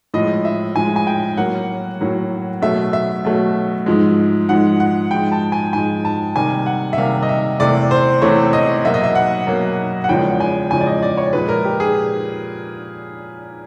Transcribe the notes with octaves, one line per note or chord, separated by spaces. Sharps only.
A2 F3 G#3 D#5
E5
A2 F3 G#3 G#5
G#5
G5
A2 F#3 A#3 F#5
A2 F#3 A#3
B2 F#3 A3 E5
E5
B2 F#3 A3
G#2 F3 G#3
G#2 F3 G#3 F#5
F#5
G#2 F3 G#3 G5
A5
G#5
G#2 F3 G#3 G#5
A5
C3 D#3 G3 A#3 G#5
F#5
E5
C3 D#3 G3 A#3 F5
D#5
E5
E2 C3 E3 A3 D5
C5
E2 C3 E3 A3 C#5
D#5
B2 F#3 A#3 E5
D#5
E5
F#5
B2 F#3 A#3
F#5
E2 C#3 F3 G#3 G5
G#5
E2 C#3 F3 G#3 G#5
D5
D#5
D5
C#5
A#2 F3 G#3 B4
A#4
G4
G#4